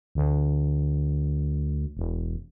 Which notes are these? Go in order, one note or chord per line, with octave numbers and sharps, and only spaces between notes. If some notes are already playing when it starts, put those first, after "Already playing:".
D2
E1